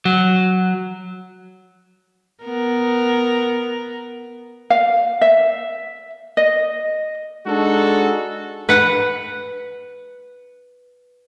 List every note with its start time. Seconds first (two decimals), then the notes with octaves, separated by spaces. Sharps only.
0.05 F#3
2.43 B3 A#4
4.70 F5
5.21 E5
6.37 D#5
7.47 G#3 D4 D#4 F#4 A4
8.69 B4 F#5